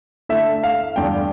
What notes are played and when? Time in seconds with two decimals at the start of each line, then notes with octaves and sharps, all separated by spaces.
0.29 D3 A3 E4 E5
0.64 F5
0.96 E2 D3 G3 D4 G5